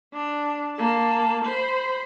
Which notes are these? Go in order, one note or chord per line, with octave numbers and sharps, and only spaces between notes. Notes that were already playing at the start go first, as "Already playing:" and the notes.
D4
A#3 A5
C5 B5